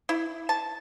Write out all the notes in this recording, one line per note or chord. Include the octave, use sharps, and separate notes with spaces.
E4
A5